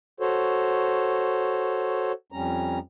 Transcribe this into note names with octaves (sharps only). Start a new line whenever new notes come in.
F#4 A4 C5 C#5
F2 G3 C#4 A#5